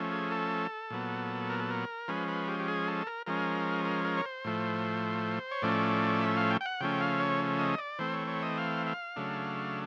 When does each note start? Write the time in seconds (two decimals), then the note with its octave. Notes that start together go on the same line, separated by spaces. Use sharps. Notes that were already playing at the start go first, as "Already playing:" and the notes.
Already playing: F3 A3 C#4
0.12 G#4
0.31 A4
0.90 A#2 F#3 B3
1.50 A#4
1.60 A4
1.71 A#4
2.08 F3 G#3 C#4 B4
2.28 B4
2.48 G4
2.60 G4
2.68 G#4
2.88 A4
3.07 A#4
3.26 F3 G#3 C#4 A#4
3.85 A#4
4.05 A#4
4.17 C#5
4.26 C5
4.44 A2 F3 A3
5.52 C#5
5.62 A2 F3 A3 C#4 D5
6.21 E5
6.37 F5
6.51 G5
6.61 G5
6.66 F#5
6.81 C#3 F3 A3 C#4 G5
7.01 F5
7.20 C#5
7.59 D#5
7.78 D5
7.99 E3 A3 C4 C5
8.13 C#5
8.28 C#5
8.42 D#5
8.58 F5
8.87 F5
9.16 C#3 F#3 A3 D4